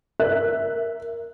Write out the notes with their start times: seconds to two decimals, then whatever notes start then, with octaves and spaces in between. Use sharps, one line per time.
0.19 A#4 E5 F#6